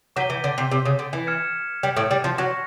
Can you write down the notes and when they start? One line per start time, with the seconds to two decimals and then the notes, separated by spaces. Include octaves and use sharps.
0.16 F#3 D6 G6 B6 D#7 G7
0.30 E3
0.44 D3
0.58 C3
0.71 C3
0.85 C#3
0.99 D3
1.13 E3
1.27 F6 G#6 C#7 E7
1.83 G3
1.96 A2 A3
2.11 G3
2.24 F3
2.38 F#3 C#6 F#6 A#6 C#7